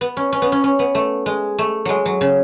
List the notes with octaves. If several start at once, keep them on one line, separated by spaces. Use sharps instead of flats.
B3
C#4
C#4
B3
C#4
C#4
B3
A3
G#3
A3
F#3 G#3
F#3
C#3